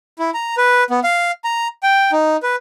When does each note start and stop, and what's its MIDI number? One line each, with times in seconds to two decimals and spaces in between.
0.19 0.30 64
0.34 0.55 82
0.57 0.84 71
0.90 1.00 59
1.04 1.31 77
1.44 1.68 82
1.83 2.11 79
2.12 2.37 63
2.43 2.56 71